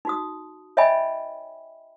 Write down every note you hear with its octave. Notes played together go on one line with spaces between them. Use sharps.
D#4 F#4 D#6
C#5 D#5 E5 G5 G#5 B5